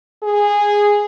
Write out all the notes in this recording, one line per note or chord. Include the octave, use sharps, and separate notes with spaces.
G#4